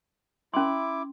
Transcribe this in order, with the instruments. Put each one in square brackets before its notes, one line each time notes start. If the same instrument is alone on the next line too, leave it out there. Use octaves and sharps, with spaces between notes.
[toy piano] C#4 C6 [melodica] E4 D6